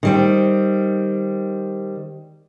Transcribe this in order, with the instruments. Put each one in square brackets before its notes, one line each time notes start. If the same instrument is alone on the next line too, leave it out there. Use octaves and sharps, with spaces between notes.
[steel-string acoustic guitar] D#3 G3 C4